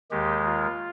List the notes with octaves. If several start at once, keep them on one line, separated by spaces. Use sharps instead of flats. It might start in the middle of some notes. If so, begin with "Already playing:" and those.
D#2 D#3 G#3 G4
F4